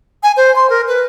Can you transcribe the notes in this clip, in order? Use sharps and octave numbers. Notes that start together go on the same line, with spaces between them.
G#5
C5
C6
A#4
B4